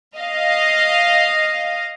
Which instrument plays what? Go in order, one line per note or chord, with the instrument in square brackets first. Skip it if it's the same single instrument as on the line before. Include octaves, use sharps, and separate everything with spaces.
[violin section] D#5 F5